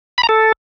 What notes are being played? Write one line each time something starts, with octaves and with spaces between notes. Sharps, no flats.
B5
A#5
A4